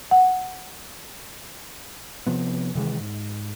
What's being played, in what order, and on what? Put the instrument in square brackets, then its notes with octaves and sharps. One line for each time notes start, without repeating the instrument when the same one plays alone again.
[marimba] F#5
[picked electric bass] C3 F3 B3
C3 D#3 E3 G#3
G#2